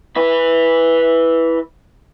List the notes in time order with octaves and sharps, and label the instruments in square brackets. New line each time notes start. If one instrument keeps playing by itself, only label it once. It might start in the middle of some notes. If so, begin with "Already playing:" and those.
[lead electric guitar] E4 B4